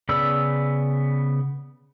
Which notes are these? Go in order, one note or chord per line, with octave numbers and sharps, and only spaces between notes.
C#3 B3 D5 B5 E6